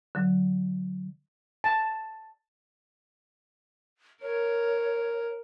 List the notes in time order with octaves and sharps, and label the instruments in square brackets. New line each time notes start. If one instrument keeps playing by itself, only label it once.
[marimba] D3 F#3
[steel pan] A5
[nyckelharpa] A#4 [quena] C#5